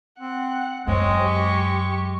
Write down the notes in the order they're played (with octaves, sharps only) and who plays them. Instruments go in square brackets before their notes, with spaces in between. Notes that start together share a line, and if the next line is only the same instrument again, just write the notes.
[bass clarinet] C4 [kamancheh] F#5
[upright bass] F#2 [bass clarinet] G#3 [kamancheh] C4 C#5
[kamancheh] G4 C#6